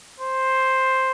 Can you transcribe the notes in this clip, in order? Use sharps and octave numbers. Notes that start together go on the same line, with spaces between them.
C5